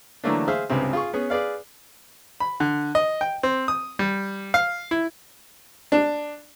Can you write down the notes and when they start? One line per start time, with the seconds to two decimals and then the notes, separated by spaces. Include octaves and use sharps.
0.24 D3 E3 F#3 A3 A#3 D4
0.48 G#4 C5 E5 F5
0.70 C#2 G2 C3 C4
0.93 F4 G#4 C#6
1.13 B3 C#4 G#4
1.30 G#4 B4 D5 F5
2.40 B5
2.60 D3
2.95 D#5
3.21 G5
3.43 C4
3.68 D#6
3.99 G3
4.54 F5
4.91 E4
5.92 D4